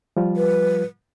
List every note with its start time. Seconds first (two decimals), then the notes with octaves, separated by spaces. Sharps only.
0.17 F3 G3 F4
0.37 B4